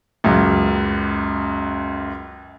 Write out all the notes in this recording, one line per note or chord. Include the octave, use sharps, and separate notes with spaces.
C#2 F#2